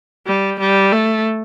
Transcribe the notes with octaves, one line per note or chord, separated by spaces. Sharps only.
G3
G3
A3